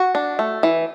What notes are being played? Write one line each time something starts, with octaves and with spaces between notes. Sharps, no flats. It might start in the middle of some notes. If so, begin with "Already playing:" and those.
Already playing: F#4
D4
A3
E3